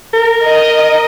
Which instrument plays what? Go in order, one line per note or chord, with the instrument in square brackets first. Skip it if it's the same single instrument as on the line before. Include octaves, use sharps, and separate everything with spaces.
[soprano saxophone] A#4
[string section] D#5